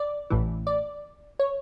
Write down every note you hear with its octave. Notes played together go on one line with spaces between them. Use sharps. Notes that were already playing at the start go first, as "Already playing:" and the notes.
Already playing: D5
A1 A2 E3
D5
C#5